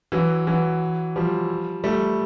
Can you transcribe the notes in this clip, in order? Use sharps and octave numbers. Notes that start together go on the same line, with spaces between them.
E3 F#3
E3 F#3
F3 G3
G3 A3